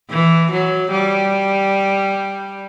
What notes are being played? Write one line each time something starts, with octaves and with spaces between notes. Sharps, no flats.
E3
F#3
G3